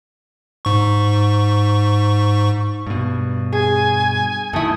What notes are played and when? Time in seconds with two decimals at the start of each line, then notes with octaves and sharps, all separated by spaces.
0.65 G#2 C#6
2.86 G2 B2
3.52 G#4 G#5
4.53 F#2 D#3 A3 E4 D#6